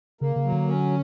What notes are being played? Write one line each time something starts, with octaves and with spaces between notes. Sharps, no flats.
C#3 A#3
C#3
F#3
D3
C#4